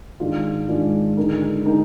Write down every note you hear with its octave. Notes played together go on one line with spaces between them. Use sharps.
G#2 D#3 G#3 D4 F4
G#2 D#3 G#3 D4 F4
D3 G#3 D#4 A#4
D3 G#3 D#4 A#4